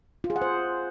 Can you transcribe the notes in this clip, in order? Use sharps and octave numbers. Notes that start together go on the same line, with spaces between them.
F4
G#4
F#5
C5